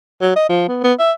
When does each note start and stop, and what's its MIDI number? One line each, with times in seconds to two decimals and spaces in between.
0.22 0.31 54
0.36 0.45 75
0.49 0.66 53
0.68 0.82 59
0.84 0.93 59
0.99 1.12 76